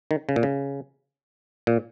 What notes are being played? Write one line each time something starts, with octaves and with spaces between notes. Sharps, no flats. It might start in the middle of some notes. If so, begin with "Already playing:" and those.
D#3
C#3
A#2
C#3
A#2